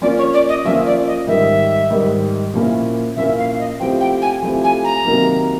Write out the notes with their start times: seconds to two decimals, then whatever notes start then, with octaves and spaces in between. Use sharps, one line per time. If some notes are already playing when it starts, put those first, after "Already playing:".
0.01 F3 A#3 C#4 F4 D5
0.18 C#5
0.33 D5
0.49 D#5
0.65 F3 A#3 C#4 F4 E5
0.86 D5
1.07 D#5
1.27 G#2 D#3 G3 E5
1.90 G#2 D#3 G3
2.54 A#2 F3 A#3 C#4 E4
3.16 A#2 F3 A#3 C#4 E4 E5
3.38 F5
3.59 D#5
3.80 F3 A3 C4 E4 G4 G5
4.00 G5
4.22 G#5
4.42 F3 A3 C4 E4 G4
4.63 G#5
4.84 A#5
5.05 C3 D#3 F#3 A#3